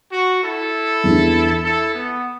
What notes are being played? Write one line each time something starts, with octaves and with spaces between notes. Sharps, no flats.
F#4
E4 A4
E2 E3 D4
E4 A4
B3